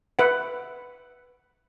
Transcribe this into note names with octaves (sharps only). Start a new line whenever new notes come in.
B4 E5 F#5